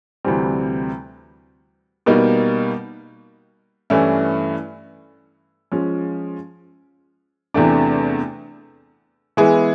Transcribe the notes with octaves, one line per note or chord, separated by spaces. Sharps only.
D2 C3 E3 G3 C4
B2 G3 A#3 D#4
G2 E3 A3 C#4 E4
F3 G#3 C#4
E2 C3 E3 A3 D4
E3 G#3 B3 E4 G#4